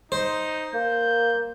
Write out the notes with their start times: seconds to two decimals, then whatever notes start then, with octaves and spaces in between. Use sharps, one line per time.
0.12 D#4 C5
0.74 A#3 G6